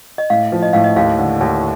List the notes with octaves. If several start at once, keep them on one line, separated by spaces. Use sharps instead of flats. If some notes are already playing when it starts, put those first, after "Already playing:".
D#5
A2 F5
F3
D#5
A2 F5
D#5
D#2 F5
D3
D#2